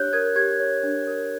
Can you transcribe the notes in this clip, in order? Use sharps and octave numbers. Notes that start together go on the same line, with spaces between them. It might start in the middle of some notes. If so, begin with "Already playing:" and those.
Already playing: D4 G4 C#5 F#6 G6
A#4 G#6
G4 G#6
C#5
D4
A#4